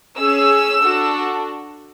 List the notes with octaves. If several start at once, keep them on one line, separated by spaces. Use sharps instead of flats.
C#4 G#4 E6
D4 F#4 A4